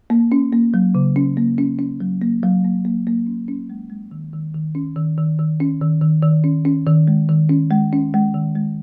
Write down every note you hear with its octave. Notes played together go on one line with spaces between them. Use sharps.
A#3
C#4
A#3
F#3
C#3
C#4
A#3
C#4
C#4
F#3
A#3
F#3
A#3
A#3
A#3
C#4
C#4
G#3
G#3
D#3
D#3
D#3
C#4
D#3
D#3
D#3
C#4
D#3
D#3
D#3
C#4
C#4
D#3
G#3
D#3
C#4
G#3
C#4
G#3
D#3
G#3